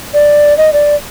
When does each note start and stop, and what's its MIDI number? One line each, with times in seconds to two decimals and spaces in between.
0.14 0.56 74
0.58 0.73 75
0.73 0.95 74